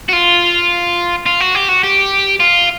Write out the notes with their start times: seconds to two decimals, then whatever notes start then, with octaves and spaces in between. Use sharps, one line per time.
0.09 F#4
0.13 F4
1.26 F4
1.40 F#4
1.55 G4
1.69 F#4
1.83 G4
2.40 F4